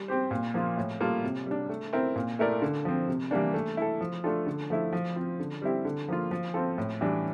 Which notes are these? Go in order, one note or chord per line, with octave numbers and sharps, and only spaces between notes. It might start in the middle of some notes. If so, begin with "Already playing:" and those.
Already playing: G3
C4 G4 C5
A#2
F3 A#3 F4
A2
G3 A#3 F4 A4
C3
G3 D4
A3
C4 E4 A#4
A#2
A3 E4 A#4 D5
D3
F3 C4
C3
E3 G3 A#3 D4
A3
E4 A4
F3
A3 D4 F4 A4
D3
F3 A3 E4
F3
C4 F4
D3
G3 C4 E4 G4
D3
F3 A#3 F4
F3
C4 F4 A4
A2
E3 G3 D4